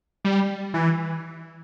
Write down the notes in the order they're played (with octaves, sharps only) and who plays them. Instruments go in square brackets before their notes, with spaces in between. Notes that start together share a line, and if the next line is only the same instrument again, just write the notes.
[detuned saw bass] G3
E3